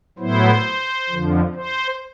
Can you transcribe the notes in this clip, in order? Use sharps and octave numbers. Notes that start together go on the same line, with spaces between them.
A2 F#3 B3 E4 C5
F2 D3 F3
C5